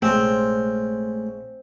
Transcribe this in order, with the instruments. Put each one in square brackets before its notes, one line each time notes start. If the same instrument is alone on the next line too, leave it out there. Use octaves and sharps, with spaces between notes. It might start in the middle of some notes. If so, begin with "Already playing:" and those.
[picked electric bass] A#1 C3 [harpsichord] G#3 C#4 F4 [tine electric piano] A3 [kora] C4